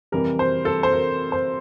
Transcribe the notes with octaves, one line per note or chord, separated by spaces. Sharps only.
F2 C3 E3 G3 A#4
C5
A4
C5
A#4
C5